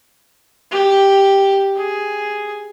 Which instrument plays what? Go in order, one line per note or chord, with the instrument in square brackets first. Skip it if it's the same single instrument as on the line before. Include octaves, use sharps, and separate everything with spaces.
[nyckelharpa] G4
G#4